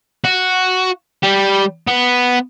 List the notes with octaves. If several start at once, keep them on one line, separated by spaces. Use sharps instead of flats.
F#4
G3 G4
B3